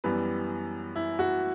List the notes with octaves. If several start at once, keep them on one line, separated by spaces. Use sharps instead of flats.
F#2 E3 G3 B3 B4
E4
F#4